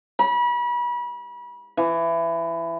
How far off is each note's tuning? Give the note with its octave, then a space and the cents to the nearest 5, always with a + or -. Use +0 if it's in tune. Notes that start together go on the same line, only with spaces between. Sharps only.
B5 -35
E3 +20